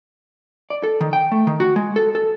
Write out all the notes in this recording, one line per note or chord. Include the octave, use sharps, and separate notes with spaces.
D5
A4
D#3
G5
A3
D#3
F#4
G#3
A4
A4